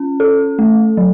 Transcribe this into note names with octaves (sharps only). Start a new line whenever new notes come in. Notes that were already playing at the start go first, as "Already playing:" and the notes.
Already playing: C#4
A4
A3
F#3